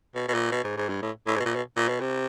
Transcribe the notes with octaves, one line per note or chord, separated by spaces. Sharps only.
B2
B2
A#2
B2
G#2
G#2
G2
A2
A2
G#2
B2
A#2
B2
A#2
B2
C3